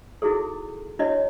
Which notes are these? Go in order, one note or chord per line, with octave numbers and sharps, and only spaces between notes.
D#4 E4 F#4 G#4 A4
D4 E4 F#4 C#5 D#5